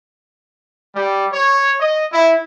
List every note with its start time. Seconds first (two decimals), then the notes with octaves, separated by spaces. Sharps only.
0.95 G3
1.32 C#5
1.79 D#5
2.12 E4